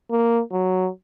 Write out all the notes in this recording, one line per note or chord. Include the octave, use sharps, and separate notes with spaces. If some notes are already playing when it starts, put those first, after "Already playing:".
A#3
F#3